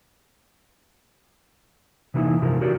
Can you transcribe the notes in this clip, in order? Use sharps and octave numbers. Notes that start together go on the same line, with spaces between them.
C3 E3 A#3 D#4 E4
G2 C3 F3 A#4
F#4 G4 A#4 C#5 D5